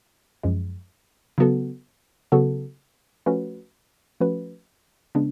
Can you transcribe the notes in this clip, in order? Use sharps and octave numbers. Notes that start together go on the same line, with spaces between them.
F#2 F3 G#3
C#3 F#3 B3 F#4 A4
C#3 F#3 B3 F#4 A4
F3 A3 C#4 F#4 B4
F3 A3 C#4 F#4 B4
C#3 G#3 B3 D4